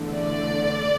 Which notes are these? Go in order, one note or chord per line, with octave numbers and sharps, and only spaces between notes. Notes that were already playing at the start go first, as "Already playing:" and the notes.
Already playing: E2 D3 A3
D5